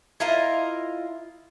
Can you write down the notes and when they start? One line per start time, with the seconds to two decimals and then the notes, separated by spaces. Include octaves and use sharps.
0.20 E4 F4 A#4 D#5